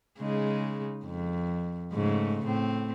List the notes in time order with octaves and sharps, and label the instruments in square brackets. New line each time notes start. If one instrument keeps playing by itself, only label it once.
[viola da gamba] C#3 G#3 D#4
F2
G#2 C#3 A3
A2 C4